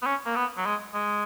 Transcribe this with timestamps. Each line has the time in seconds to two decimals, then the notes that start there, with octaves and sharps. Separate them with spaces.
0.02 B3
0.06 C#4
0.26 A#3
0.36 B3
0.57 F#3
0.66 G#3
0.95 G#3